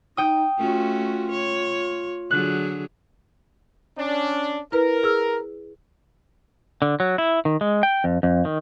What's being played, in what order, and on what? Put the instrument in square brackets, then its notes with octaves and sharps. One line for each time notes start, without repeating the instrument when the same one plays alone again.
[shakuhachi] D#4 [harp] G5 D#6
[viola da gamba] A3 C#4 F#4 [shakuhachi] F4
[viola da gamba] C#5
[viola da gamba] D3 F#3 G#4 [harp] F#6
[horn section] C#4 D4
[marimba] E4 B4 [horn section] A#4
[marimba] G#4 E6 F6
[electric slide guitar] D3
F#3
E4
D#3
G#3
G5
F2
F2
D#3